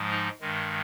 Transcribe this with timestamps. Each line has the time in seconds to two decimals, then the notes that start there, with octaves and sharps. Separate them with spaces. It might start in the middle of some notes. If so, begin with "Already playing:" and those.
Already playing: G#2 F3 G#3
0.10 D#4
0.41 G2 D#3 G#3